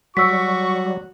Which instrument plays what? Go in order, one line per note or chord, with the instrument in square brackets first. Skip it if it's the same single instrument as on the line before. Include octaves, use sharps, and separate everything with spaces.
[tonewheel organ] F#3 G3 [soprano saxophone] F#4 [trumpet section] C#6 [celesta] E6 B6